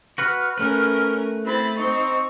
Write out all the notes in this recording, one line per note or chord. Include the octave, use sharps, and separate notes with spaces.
F#4 B4 F#5 F6
A3 C#4 A#4 B4
C4 E4 B5 A6
C4 D#4 C#6